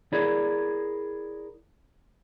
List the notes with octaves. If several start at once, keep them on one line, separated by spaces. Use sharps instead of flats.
E4 G#4 A#4 C#5 D5